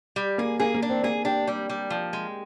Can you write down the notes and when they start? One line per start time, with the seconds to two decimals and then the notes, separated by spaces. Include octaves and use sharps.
0.16 G3
0.38 A#3 G#4
0.60 A#3 G#4
0.74 A#3
0.82 D4
0.90 C4
1.04 A#3 G#4
1.25 D4 G4
1.47 G3
1.69 G3
1.90 F3
2.13 G#3